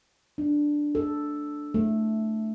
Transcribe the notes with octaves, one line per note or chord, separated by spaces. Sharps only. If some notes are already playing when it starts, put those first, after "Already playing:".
D4
A4
A3